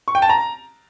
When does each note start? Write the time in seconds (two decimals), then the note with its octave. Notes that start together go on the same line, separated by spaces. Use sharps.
0.08 C#6
0.15 G5
0.22 A5
0.29 A#5